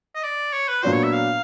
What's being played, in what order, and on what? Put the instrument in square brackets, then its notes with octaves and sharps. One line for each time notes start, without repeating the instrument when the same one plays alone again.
[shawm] D#5
D5
C#5
B4
[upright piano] A#2 F#3 B3 D4 F#4 [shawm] C5
[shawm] C#5
E5
F5